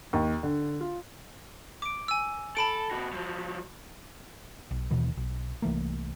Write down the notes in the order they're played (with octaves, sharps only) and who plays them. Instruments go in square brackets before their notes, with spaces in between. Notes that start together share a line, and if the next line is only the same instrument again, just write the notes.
[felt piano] D#2
D3
F4
[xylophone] D6 D7
G#5 E6
[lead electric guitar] A4 [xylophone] A5 B5 D7
[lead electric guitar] C3 F#4
F3 F#3
[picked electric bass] B1
D#2 B2 E3
B1
C2 E3 A3 A#3